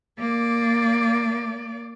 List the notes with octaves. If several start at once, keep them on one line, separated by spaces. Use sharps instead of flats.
A#3 D5